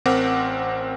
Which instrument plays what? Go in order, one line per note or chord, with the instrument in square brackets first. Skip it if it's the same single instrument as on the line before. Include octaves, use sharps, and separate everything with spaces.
[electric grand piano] A1 C4 A#4 F#5 D6